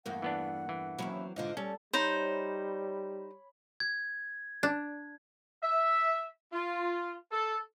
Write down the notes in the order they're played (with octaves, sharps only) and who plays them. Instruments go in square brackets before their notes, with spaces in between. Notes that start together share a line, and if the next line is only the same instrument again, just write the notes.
[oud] E2 G2 A#3 [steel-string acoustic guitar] A3 [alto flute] F#5
[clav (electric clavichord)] E3 B3 D4
E3
[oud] D#2 C#4 E4 [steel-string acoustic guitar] F#3 C4
[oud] G#2 D3 [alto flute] F4 [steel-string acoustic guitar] C5 D#5 F5
[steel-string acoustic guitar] G3 [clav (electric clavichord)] C#4 [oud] A4 [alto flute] D5
[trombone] G3 [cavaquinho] D#4 C5 [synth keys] C#5 B5
[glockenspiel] G#6
[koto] D4
[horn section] E5
F4
A4